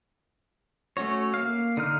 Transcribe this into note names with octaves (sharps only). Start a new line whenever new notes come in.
A3 C#4 F#4 C#5
A#3 F5
D3 D#4 F6